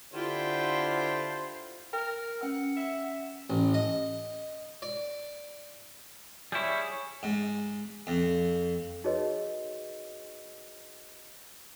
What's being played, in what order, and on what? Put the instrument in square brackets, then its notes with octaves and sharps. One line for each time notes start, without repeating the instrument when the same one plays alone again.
[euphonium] D3 [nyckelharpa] E4 F4 [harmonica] G4 [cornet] C5
[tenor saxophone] A#4 [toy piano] G5
[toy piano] C#4 B4 E6 [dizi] F#5
[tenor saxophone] E5
[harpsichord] A1
D#5
D5
[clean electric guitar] G3 E4 [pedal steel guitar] G#4 C#5
[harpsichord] G#2
F2
[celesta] D#4 F#4 G#4 B4 C#5 D#5